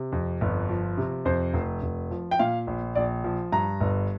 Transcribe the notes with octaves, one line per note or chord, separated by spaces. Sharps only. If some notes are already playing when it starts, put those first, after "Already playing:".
Already playing: C3
F2
G1
F3
C3
F2 C5
F1
F1
F3
G5
A#2 F5
A#1
A#1 D5
F3
G2 A#5
G1